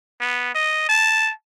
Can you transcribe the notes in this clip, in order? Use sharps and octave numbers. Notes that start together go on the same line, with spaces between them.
B3
D#5
A5